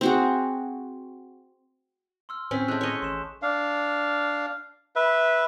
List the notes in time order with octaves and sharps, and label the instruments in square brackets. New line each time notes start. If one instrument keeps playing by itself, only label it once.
[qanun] C4 F#4 G#4
[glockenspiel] C6 E6 F6
[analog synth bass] A2 [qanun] C4 C#4 [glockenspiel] G#5 F6 B6
[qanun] G#3 A3 [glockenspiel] E6 F#6 G6
[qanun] C#5 D#5
[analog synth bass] A1 [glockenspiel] C6 E7
[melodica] D4 F5
B4 E5